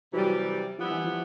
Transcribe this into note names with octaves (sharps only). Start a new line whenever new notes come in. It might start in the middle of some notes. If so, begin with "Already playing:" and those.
C3 E3 F#3 G3
F3 G3 B3 E4
E3
F3